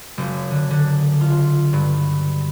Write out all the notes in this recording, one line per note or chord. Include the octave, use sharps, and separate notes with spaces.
F#1
D3
D3
F4
G2